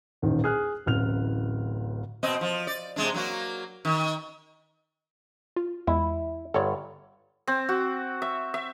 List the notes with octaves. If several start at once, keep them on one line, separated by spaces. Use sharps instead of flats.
D#1 A1 D#3
G#4 F6 F#6
D1 A1 F6 F7
B2 C4 D#5
F3
D5
C3 G#3 D4
F#3 A#3 F#4
D#3
F4
E2 G#3 E4
G1 A4 C#5 D5
C4
F#4
E5
E5